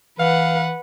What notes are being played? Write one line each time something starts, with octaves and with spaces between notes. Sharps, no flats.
E3 B4 F5 F#5